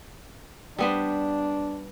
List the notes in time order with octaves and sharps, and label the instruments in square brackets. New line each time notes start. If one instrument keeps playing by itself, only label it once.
[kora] G3 B3 C5 [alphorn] D4